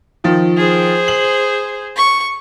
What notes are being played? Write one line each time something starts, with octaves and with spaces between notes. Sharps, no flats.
D#3 F3
G#4 C5
F#7
C#6